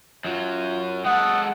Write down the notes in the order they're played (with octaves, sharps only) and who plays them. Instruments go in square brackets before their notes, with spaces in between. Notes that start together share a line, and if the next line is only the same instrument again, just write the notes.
[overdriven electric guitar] F#2 F#3 [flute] F4
[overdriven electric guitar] G#3 A4 [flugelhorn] F#5 [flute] D#6